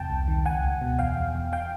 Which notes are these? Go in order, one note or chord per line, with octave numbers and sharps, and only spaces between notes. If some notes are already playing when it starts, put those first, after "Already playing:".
Already playing: E2 C3 G5 A5
C2
D#3
C#2 F#5 G#5
C#2
B2
E2 F5 G5
E2
E2
F5 G5